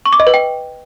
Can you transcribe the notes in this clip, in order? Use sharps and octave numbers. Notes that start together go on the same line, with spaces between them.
C#6
D6
D#5
B4
G5